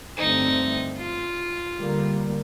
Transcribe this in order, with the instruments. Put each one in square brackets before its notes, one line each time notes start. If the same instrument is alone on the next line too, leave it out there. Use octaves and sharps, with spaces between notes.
[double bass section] G2 D3 A3 C4 [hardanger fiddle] D#4
[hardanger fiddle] F4
[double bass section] D3 G3 A#3